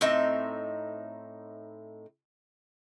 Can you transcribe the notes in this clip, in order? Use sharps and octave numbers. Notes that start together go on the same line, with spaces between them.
A2 C4 D#4 E5